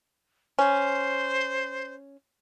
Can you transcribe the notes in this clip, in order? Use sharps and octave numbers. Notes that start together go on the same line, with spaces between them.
C#4 C5